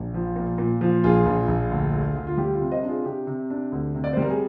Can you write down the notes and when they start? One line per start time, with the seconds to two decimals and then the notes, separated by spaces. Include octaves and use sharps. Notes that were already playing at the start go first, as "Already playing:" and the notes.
Already playing: A#1
0.14 F3
0.36 A#2
0.58 A#2
0.81 F3
1.04 A#1 F4 G#4
1.26 A#1
1.48 A#1
1.71 D2
1.93 D2
2.16 D2
2.27 F4
2.37 G3 G4
2.54 F4
2.61 C3
2.71 C5 D#5
2.83 D4
2.88 F4 G#4
3.05 C3 G4
3.27 C3
3.50 D4
3.72 D2
3.95 C3
4.04 D5
4.13 G3 C5
4.22 A#4
4.30 G#4